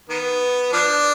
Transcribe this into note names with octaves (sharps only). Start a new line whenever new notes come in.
D#3 B3
F3 B3 D4